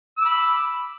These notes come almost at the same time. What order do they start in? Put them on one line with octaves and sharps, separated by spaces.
E6 D6 B5